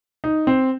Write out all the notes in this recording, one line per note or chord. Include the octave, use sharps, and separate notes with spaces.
D#4
C4